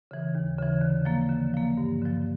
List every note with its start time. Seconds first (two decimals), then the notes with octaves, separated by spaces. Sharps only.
0.11 C#3 E3
0.35 D#2
0.58 C#3 E3
0.81 D3
1.05 F3 A#3
1.29 D3
1.54 F3 A#3
1.77 G2
2.02 D3 F3